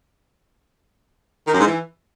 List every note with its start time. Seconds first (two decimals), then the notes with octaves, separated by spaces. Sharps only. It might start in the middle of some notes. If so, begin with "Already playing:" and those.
1.48 D#3
1.54 F#2
1.60 G#2
1.67 E3